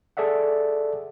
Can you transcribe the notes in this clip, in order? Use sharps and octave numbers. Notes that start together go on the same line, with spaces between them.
G#4 A4 D5 E5 F#5